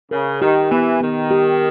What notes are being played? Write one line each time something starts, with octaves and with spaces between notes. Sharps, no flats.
C#3 A#4
D#3 G4
E3 B3
D#3 B3
G4